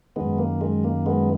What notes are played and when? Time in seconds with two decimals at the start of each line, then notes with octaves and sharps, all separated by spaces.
0.16 F#2 D#3 G#3 B3
0.38 A#3
0.61 G#3
0.84 A#3
1.06 G#3 B3